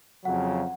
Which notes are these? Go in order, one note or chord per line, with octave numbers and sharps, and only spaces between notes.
F2 C#3 F#3 F#5